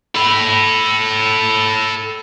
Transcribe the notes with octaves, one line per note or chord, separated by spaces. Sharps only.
A4 B5